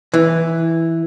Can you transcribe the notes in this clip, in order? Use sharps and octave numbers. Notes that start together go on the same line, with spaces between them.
E3